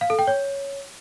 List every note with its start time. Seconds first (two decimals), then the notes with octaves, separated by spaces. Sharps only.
0.01 F5
0.10 A4
0.19 G5
0.27 C#5